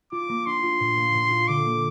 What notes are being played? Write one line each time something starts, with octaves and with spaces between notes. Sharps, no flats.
F4 D6
A#3
D4 C6
F4
A#2
A#3
A#2
F4
D3 D6
A#3